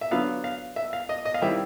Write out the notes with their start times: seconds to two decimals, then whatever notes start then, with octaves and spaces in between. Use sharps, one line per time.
0.01 E5
0.11 D3 F#3 B3 F5
0.44 F5
0.76 E5
0.93 F5
1.09 D#5
1.25 D#5
1.34 F5
1.42 D#3 G3 C4 E4 E5